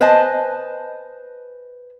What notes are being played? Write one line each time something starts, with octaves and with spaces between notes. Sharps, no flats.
B4 C5 D#5 G#5 A5